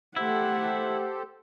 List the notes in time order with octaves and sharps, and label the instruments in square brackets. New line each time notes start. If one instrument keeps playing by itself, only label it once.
[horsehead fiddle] A3 F#5 [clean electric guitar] E4 [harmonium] G4 A4 C5